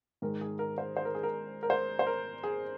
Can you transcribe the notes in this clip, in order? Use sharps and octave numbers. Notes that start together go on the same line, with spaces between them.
G#2 D#3 G#3 A#4
G#4
A#4
C5
C5
A#4
G#4
A#4
A#4
C5
C5
A#4
G#4